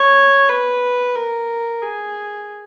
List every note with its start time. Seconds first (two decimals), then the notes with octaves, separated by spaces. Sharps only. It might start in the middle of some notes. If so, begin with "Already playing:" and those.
Already playing: C#5
0.49 B4
1.16 A#4
1.82 G#4